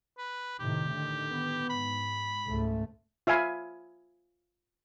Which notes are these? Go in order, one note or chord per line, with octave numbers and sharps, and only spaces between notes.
B4
A2 C3 D#3 G4
D3 D#3
B3
G#2 B5
C#2 G#2 A3
F4 E5 F5 G#5 B5